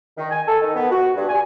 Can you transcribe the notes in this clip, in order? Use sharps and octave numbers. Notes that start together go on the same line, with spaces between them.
D#3
G#5
A4
D#3
B3
F#4
G2
G#5